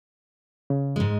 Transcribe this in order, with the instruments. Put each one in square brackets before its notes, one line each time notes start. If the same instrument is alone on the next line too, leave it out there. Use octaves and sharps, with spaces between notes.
[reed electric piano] C#3
[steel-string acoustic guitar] G#2 G#3